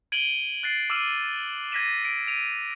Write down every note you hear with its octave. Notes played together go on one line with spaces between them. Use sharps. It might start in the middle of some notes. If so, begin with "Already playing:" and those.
G#6 D7 D#7 F#7 G7
F#6 A6 C7
D6 E6 F6 D#7 E7 F#7
G#6 A#6 B6 D#7 E7
D7
D7 D#7 F7